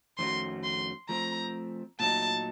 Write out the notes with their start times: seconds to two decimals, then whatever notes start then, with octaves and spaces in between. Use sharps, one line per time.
0.18 F2 D#3 A3 C#4 F#4 C6
0.64 C6
1.09 F3 A3 C4 A#5
2.00 A#2 F#3 A3 D#4 A5